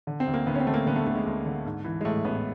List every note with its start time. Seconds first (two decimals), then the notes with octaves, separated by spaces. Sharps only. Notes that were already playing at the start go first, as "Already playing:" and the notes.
0.07 D3
0.20 C4
0.27 D2
0.34 A#3
0.46 D2 B3
0.55 C#4
0.60 C4
0.67 D3 A3
0.74 A#3
0.86 D3 B3
0.96 A3
1.06 D2 A3
1.16 G#3
1.26 D2
1.46 D3
1.65 G#2
1.85 E3
2.01 G#3
2.05 A1 A3
2.24 A1 B3